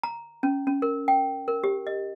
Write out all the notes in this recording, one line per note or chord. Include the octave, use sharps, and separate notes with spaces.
A#5
C#4
C#4
A#4
G5
A#4
G4
D#5